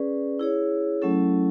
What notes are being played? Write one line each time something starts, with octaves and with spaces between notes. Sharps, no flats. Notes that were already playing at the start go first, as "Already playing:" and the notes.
Already playing: C#4 G#4 B4 D5
E4 G#4 C#5
F#3 A3 C#4 E4 A4